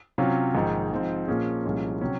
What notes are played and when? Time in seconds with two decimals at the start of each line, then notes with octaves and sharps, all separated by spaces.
0.18 C3 F#3 C#4 F4
0.55 A#1 G#2 D#3
0.91 G#2 F3 C4
1.27 A#2 F3 A#3 C#4 G#4
1.65 C2 A#2 F3 G#3 C#4
2.01 C3 F#3 C#4